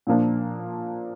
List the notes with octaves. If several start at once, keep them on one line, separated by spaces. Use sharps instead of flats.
A#2 F3 A#3 D4